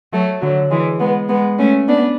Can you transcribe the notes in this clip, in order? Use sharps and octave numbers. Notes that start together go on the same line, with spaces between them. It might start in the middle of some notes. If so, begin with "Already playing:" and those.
F#3 A3
D3 F#3
E3 G#3
G#3 B3
G#3 B3
A3 C#4
B3 D4